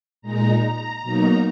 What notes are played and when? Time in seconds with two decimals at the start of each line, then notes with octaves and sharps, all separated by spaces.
0.22 A#2 G#3 D#4 A#5
0.62 A#5
1.02 B2 F#3 A#3 D#4